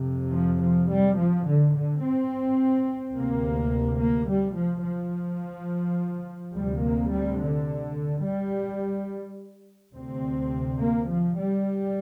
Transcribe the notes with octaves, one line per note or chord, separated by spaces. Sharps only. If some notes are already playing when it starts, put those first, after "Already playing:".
Already playing: F2 C3
F3
F3
G3
F3
D3
D3
C4
D2 C3 A#3
A#3
G3
F3
F3
D2 C3 G3
A#3
G3
D3
G3
D2 C3 C4
A#3
F3
G3